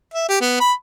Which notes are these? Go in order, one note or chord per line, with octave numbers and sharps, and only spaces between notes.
E5
G4
B3
B5